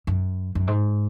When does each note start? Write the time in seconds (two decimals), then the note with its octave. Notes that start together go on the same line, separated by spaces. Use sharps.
0.07 F#2
0.55 F#2
0.67 G#2